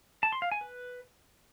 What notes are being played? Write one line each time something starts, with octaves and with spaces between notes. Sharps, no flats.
A5
C6
F5
G#5
B4